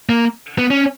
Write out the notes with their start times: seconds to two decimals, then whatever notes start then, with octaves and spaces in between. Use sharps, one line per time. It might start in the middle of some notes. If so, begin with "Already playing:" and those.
0.09 A#3
0.58 B3
0.70 C#4